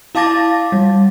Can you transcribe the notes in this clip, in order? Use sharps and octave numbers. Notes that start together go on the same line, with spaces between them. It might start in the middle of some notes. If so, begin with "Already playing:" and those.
E4 F5 A5 D6 A6 A#6
G3